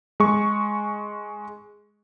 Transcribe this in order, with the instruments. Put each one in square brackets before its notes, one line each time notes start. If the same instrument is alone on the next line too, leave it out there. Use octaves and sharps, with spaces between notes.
[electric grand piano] G#3 C#6